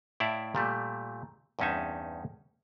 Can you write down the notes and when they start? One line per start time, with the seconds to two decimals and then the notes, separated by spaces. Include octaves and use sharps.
0.20 A2 E4 D5 E5 F5
0.55 A#2 G3 A3
1.59 E2 G2 C4 C#4 D#4 E5